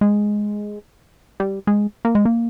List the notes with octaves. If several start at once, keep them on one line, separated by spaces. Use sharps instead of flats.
G#3
G3
G#3
A#3
G#3
A#3